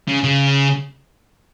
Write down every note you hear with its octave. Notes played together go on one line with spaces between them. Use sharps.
C#3
C#3